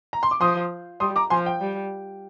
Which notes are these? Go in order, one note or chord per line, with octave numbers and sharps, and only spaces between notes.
A#5
C6
D6
F3 C6 D#6
G3 C6 D#6
A#5 D6
F3 G#5 C6
G5
G3